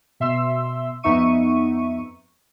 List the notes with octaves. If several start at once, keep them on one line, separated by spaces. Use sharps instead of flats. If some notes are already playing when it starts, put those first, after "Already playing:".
B2 E5 C6 E6
F2 B3 D#4 E5 C#6 D#7